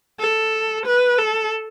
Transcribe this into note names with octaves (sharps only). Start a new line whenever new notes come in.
A4
B4
A4